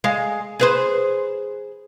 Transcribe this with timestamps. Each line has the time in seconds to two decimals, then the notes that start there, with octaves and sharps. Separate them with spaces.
0.04 G#3 F5
0.60 G#4 B4 C5